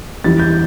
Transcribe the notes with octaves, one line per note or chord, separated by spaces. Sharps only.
E2 E3 G3 A6
G6